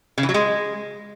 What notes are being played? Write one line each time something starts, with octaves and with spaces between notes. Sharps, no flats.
C#3
E3
F#3
G#3